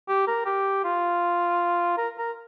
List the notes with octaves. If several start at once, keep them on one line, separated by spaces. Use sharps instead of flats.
G4
A#4
G4
F4
A#4
A#4